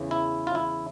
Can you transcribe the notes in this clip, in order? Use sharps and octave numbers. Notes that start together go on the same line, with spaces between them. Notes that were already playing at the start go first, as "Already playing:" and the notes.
Already playing: E2 C#3 E3
E4
F4
E4